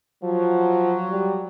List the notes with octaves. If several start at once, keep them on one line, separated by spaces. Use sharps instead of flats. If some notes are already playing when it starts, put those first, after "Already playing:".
F3 F#3
G3